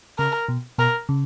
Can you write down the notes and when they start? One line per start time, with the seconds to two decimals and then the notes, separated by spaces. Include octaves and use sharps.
0.18 C#3 A#4
0.48 B2
0.78 B2 A#4
1.09 C#3